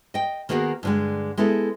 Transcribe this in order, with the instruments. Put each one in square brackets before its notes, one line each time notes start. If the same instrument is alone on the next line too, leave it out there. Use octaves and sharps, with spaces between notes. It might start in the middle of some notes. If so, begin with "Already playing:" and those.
[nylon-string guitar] D#5 G5
D#3 A#3 B3 F#4 G#4
G2 D3 G#3
G#3 B3 E4 A4